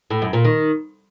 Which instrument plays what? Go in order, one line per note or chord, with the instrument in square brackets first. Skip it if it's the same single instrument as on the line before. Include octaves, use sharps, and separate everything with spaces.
[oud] A2
F#2
A#2
D#3